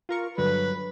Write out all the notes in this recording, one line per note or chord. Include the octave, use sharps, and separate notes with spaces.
F4 A#4 C#6
G2 D3 F#3 B4